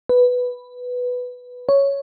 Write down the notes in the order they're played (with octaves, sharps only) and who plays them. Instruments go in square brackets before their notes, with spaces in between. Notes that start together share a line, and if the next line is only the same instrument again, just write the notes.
[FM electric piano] B4
C#5